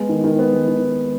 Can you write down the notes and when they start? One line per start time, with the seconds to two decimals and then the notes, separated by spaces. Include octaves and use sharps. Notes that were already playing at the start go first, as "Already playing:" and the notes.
Already playing: G#3 B3
0.09 D#3
0.24 D#3
0.39 B3
0.53 G#3
0.68 D#3